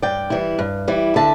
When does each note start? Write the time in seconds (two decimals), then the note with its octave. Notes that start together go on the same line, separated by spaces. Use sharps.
0.02 G2 D5 G5
0.30 E3 G3 E4
0.59 G2
0.88 E3 G3 E4
1.16 D3 E5 A5